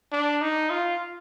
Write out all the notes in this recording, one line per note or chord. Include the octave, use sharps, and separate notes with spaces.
D4
D#4
F4